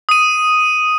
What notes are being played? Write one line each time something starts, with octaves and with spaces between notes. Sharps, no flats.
D#6 D#7